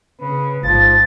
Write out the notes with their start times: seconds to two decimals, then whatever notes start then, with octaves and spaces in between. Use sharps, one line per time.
0.21 C#3 B4
0.63 A1 G#2 F3 A6